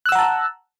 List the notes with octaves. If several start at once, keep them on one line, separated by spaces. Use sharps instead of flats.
F#5 A5 A#5 E6 F#6